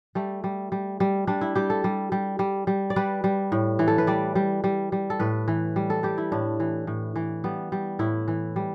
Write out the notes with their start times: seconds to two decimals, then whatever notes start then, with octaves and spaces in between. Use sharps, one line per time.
0.15 G3 A3
0.44 G3
0.72 G3
1.00 G3
1.27 G3 D4
1.41 E4
1.55 G3 G4
1.70 A4
1.84 G3
2.12 G3
2.39 G3
2.67 G3
2.90 D5
2.96 G3 B4
3.24 G3
3.52 A2
3.79 E3
3.88 A4
3.98 B4
4.07 G3 D5
4.35 G3
4.64 G3
4.92 G3
5.10 A4
5.20 A2 B4
5.48 E3
5.76 G3
5.90 A4
6.03 G3 G4
6.18 E4
6.32 A2 D4
6.60 E3
6.87 A2
7.16 E3
7.44 G3 B3
7.72 G3
7.99 A2 E4
8.28 E3
8.56 G3